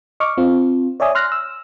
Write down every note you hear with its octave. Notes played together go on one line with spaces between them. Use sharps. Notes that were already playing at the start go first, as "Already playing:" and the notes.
D#5 C#6 D6 F6
C4 F4
C#5 D5 E5 G#5 D#6
C6 F6 F#6 A#6
E6